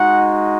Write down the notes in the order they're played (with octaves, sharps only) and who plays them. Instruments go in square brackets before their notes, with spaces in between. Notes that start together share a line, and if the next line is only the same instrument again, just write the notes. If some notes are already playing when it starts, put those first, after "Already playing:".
Already playing: [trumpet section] G#3 D#4 F#4 F#5